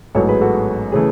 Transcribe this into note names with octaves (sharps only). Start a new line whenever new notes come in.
A1 G#2 F#3 B3 A4 C#5
G#4 B4
F#4 A4
C#3 E3 A3 G#4